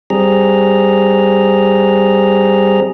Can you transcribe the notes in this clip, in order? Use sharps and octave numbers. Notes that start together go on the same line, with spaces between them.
G3 C4 G#4 A#5